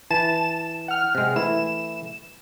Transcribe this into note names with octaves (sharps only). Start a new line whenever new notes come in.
E3 A5 E7
F#5 F6
C3 G#3
E3 A3 E4 E7